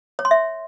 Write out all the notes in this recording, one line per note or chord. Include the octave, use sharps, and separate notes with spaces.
C#5
C6
E5